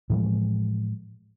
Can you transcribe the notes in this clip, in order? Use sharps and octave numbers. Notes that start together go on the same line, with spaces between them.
A2 E3 F3 G#3